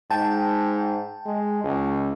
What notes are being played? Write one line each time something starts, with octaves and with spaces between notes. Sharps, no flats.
G#2 G5 A5
G#3
C#2